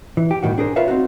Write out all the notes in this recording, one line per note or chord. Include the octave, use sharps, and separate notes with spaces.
E3
G4
B1 E2 A2 D#3 F#4
D4 G#4 A#4 C5
F4 A#4 B4 C#5 E5 F5
C4 D#4 F#4